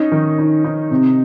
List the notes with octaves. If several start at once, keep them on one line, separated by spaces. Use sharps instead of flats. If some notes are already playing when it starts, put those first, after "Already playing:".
Already playing: C#4 D#4
D#3
D#4
D#4
C3